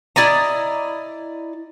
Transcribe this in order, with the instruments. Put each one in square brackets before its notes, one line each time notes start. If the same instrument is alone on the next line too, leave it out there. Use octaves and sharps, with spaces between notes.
[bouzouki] E4 D5 D#5 A#5